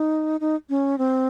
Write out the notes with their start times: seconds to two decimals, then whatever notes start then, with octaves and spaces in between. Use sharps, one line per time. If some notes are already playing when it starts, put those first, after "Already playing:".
Already playing: D#4
0.41 D#4
0.69 C#4
0.98 C4